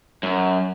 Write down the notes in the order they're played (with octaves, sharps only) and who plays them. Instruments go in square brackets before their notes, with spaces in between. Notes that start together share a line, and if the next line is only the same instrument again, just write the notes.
[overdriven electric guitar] F#2